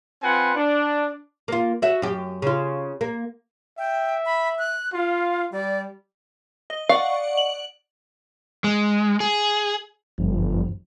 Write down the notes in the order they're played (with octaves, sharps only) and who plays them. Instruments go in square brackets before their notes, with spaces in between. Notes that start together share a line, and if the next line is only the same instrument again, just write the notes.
[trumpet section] C4 F4 B4 F#5 G#5
D4
[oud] A#3 F4
F#4 E5
F#2 G4
C#3 F4
A#3
[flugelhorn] E5 [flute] G5
[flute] B5
F#6
[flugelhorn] F4 [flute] F5
[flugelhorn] G3 [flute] D5
[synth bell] D#5
[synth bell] D5 F#5 C#6 [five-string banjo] F5
[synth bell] F#7
[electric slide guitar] G#3
G#4
[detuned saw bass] G1 [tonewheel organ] F#2 F3